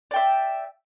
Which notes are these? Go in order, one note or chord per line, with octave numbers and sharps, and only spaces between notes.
D5 E5 G5